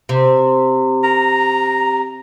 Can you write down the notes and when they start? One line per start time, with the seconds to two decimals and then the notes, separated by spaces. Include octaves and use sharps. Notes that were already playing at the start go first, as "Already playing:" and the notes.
0.09 C3
1.04 A#5